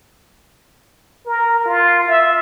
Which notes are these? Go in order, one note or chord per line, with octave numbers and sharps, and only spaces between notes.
A#4
F4
E5